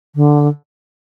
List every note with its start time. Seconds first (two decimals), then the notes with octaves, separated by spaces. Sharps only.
0.15 D3